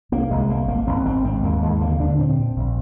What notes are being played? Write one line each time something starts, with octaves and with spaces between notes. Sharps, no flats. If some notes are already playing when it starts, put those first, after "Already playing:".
C2 A#3
C2 G#3
C2 A#3
G#1 A#3
G#1 C4
G#1 C4
G#2 C4
D#2 A#3
D#2 G#3
D3 A#3
D3 D4
A#2 C4
A#2
A#1